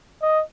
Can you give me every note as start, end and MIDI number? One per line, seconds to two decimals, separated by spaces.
0.22 0.42 75